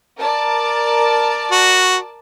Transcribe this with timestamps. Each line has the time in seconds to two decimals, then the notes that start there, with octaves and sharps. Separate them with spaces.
0.17 A#4 D5 A5
1.51 F#4